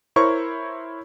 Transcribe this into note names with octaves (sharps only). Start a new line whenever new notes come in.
E4 A#4 C5 C#5 C#6